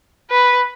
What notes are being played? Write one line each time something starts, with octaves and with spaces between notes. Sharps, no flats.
B4